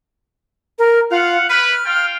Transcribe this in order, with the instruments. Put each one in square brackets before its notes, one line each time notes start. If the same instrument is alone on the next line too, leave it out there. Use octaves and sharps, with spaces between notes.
[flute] A#4
[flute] F4 [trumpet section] F5 F#5
[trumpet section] E4 B4 [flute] F6
[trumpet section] F4 F5 G5